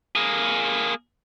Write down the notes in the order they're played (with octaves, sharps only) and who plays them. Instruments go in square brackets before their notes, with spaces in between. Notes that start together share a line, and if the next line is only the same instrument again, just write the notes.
[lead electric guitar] A#3 G#4